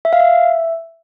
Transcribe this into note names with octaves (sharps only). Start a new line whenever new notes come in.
E5
F5
E5